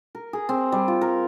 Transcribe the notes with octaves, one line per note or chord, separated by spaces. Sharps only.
A#4
G#4
C4
G3
F4
A#4